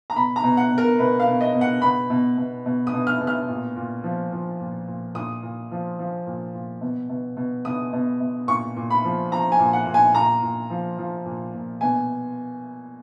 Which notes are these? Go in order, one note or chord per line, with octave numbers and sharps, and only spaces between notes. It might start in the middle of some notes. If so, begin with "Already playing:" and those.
A#5
B2 B5
A#5
B2
F#5
B2
A#4
B2 B4
F5
B2
D#5
B2
F#5
B2 B5
B2
B2
B2
D#6
B2
F6
B2
F6
A#2
A#2
F3
F3
A#2
A#2
A#2 D#6
A#2
F3
F3
A#2
A#2
B2
B2
B2
B2 D#6
B2
B2
A#2 C#6
A#2
B5
F3
F3 A#5
G#5
A#2
F#5
A#2
G#5
A#2 A#5
A#2
F3
F3
A#2
A#2
B2 G#5